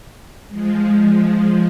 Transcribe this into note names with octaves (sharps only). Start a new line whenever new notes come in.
F3 G#3